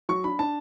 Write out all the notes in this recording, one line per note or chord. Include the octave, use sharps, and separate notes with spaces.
F#3 C#6
D4 B5
D4 A5